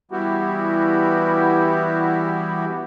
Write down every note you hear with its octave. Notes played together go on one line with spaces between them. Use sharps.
E3 G3 B3 E4 F#4 G4